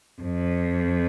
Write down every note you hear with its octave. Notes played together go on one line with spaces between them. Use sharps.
F2